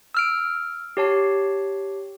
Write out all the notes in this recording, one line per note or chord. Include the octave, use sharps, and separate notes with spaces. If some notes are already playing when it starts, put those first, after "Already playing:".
E6 F6 D7
G4 C#5 A5 C7